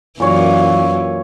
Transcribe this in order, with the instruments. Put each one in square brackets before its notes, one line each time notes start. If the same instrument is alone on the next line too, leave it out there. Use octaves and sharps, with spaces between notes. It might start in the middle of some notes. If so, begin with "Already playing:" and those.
[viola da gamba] F#2 E3 [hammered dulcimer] A#2 C#5 F5